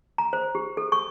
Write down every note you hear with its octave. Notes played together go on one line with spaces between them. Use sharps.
A#5
C5
G4
A4
C#6